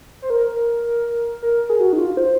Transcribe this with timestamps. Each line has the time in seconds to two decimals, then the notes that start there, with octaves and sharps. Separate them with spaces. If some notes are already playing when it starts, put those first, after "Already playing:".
0.22 C5
0.30 A#4
1.42 A#4
1.70 G#4
1.80 F#4
1.93 D#4
1.99 F4
2.17 C5